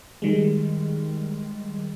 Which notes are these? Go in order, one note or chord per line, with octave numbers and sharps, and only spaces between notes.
D#3 G3 G#3